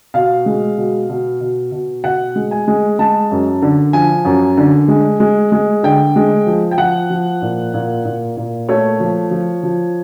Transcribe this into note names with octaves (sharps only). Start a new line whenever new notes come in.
B2 F5
G#3
B2
B2
B2
B2
B2 F#5
G#3
G#5
G#3
G#3 A5
F#2
D3
F3 G#5
F#2
D3
G#3
G#3
G#3
D3 G5
G#3
F3
G5
F3 F#5
F3
A#2
A#2
A#2
A#2
A3 C#5
F3
F3
F3